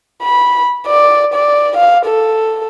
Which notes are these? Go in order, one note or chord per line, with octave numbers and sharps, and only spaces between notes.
B5
D5
D5
F5
A4